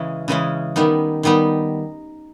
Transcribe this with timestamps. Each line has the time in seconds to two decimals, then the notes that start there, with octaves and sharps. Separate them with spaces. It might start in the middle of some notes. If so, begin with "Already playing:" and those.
Already playing: C#3 E3 G#3 C#4
0.28 C#3 E3 G#3 C#4
0.76 D#3 G3 B3 D#4
1.23 D#3 G3 B3 D#4